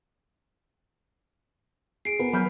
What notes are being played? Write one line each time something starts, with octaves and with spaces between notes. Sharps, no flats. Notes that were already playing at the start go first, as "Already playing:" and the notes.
G#4 C7 D7
B3 G#4 A#4
F#3 B5 F6 G6